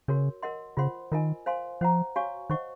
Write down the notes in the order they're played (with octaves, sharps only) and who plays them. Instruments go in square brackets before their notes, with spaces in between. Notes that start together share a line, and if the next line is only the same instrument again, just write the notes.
[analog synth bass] C#3 [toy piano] F#4 A#4 C#5
[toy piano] A#4 D#5 F#5 C6
[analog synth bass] C#3 [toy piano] F4 C5 F#5 C6
[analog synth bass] D#3 [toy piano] F4 A#4 D#5 G#5
[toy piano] C5 F5 G#5 C6
[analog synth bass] F3 [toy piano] C5 F#5 A#5
[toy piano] F#4 C#5 F5 G#5 C#6
[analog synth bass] D#3 [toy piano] C5 D#5 F#5 C#6